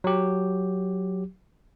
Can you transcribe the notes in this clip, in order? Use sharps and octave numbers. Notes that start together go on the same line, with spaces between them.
F#3 G4